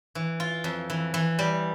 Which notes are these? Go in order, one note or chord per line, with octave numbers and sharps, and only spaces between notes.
E3
F4
F2
E3
E3
G3